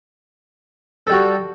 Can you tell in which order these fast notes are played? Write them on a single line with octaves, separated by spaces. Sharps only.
A4 G3 F#4